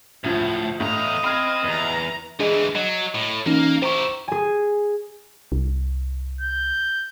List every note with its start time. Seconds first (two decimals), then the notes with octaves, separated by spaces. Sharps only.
0.24 D2 A2 F3
0.80 E2 A2 D#5 F5 A#5
1.24 C4 B5 F6 G#6
1.64 E2 E3 A#5
2.39 G#2 E3 D4 G#4 D#5
2.75 F#3 D#5
3.15 A2
3.46 E3 A#3 C#4 D#4 A#4
3.82 E4 G4 C5 A#5 C#6
4.28 G#4 G#5
5.52 C2
6.41 G6